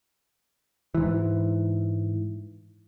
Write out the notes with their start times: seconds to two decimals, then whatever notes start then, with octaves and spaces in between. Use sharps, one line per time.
0.94 G#2 E3